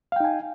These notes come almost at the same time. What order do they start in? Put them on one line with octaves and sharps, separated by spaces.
F5 G5 D#4 G#5